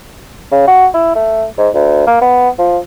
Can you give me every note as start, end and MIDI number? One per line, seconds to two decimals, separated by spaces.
0.52 0.63 49
0.67 0.87 66
0.94 1.15 64
1.16 1.45 57
1.58 1.69 44
1.74 2.04 38
2.07 2.20 58
2.22 2.49 59
2.59 2.78 53